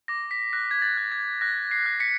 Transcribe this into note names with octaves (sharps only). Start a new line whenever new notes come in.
D6 A#6
B6
F#6 A#6
G#6
A6
F#6
G#6
F#6 A#6
C7
F#6
B6 C#7